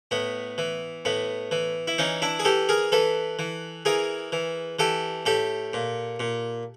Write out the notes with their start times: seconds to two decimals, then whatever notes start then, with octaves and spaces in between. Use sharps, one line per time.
0.11 A2 B3
0.58 E3
1.05 A2 B3
1.51 E3
1.88 E4
1.98 E3 C#4 D#4
2.22 D4 E4
2.39 G#4
2.45 E3 G4 A4
2.69 G#4 A#4
2.92 E3 A4 B4
3.39 E3
3.85 E3 G#4 A#4
4.32 E3
4.79 E3 G4 A4
5.26 A2 G4 A4
5.73 A#2
6.20 A#2